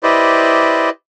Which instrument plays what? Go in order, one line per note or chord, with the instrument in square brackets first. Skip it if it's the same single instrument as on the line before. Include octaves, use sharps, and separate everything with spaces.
[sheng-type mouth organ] E4 G4 B4 C5 D5 D#5